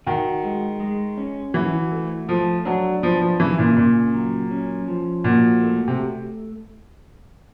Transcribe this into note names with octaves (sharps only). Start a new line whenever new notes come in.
D#3 F#4
G#3
G#3
C#4
E3 F#4
A3
F3 A3
F#3 D4
F3 B3
F3
C#3 E3
A#2
A#2 C#3
F#3
C#4
F3
A#2 F#4
A3
C3